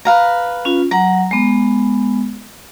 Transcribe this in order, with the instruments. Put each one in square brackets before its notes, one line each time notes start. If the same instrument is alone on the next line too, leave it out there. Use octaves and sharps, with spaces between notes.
[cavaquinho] B4 F5 A#5
[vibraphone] C#4 F4
[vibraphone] F#3 F#5 [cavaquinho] A#5
[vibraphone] G#3 B3